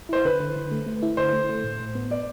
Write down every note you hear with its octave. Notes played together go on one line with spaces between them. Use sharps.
E4 C5
D3 B4
D3
D3
A3
A3
E4
D3 C5
A3
A3
A2
A2
B3
B3 D5